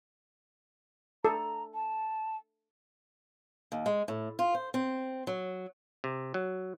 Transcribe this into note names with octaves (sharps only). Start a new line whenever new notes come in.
A4 A#5
A5
D#2
G#3
A2
F4
C5
C4
F#3
C3
F#3